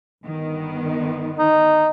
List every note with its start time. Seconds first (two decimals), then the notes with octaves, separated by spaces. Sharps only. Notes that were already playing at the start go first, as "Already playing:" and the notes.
0.25 G1 D#3 B3
1.38 D#4